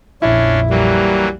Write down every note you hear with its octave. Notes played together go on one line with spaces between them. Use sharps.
A#1 F2 C#4 D4 E4
E3 F#3 G3 A#3